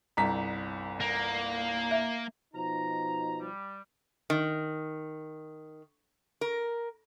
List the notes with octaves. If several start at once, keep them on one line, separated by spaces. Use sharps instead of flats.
G1 C2 A#5 B6
A#3
E5
B2 F3 D#4 A#5
G3
D#3
A#4